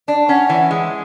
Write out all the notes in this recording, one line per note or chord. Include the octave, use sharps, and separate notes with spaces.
D4 D5
C#4 F#5
E3
G#3